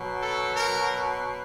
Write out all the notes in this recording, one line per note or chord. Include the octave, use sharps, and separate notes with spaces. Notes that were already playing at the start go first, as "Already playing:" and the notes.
Already playing: B2 F#3
A4
A#4